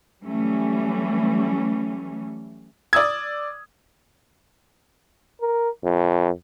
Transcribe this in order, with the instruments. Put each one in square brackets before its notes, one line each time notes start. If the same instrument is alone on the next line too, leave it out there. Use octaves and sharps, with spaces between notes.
[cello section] E3 F#3 G3 A3 C#4
[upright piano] D5 D#6 E6 G#6
[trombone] A#4
F2